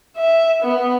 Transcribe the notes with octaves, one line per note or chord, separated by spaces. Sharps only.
E5
B3